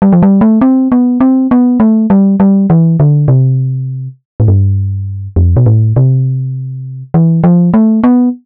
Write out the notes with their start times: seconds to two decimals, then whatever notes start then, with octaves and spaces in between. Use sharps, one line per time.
0.02 G3
0.13 F3
0.23 G3
0.41 A3
0.61 C4
0.92 B3
1.20 C4
1.51 B3
1.80 A3
2.10 G3
2.40 G3
2.70 E3
3.00 D3
3.28 C3
4.40 A2
4.48 G2
5.36 F2
5.57 B2
5.66 A2
5.96 C3
7.14 E3
7.44 F3
7.74 A3
8.04 B3